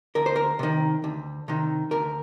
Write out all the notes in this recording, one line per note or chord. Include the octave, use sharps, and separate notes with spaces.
D2 A#4
C5
A#4
C3 D#3
D2
C3 D#3
D2 A#4